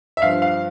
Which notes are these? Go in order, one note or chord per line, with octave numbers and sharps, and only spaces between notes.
E5
G2 F3 F5
F5